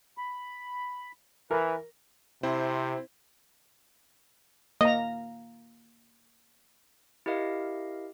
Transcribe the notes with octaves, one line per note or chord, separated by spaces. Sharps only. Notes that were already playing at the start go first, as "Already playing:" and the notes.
B5
E3 A#4 B4
C3 C4 E4 C5
A#3 D#5 A#5
E4 G4 A#4 D#5 F5